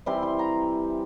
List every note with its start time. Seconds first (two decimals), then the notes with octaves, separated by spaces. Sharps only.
0.06 C3 E3 G3 C6
0.22 C6
0.39 A#5